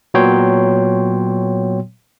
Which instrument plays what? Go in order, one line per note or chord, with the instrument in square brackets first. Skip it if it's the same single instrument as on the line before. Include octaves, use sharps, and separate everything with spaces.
[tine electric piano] A#2 F#3 B3 C#5 G5 C6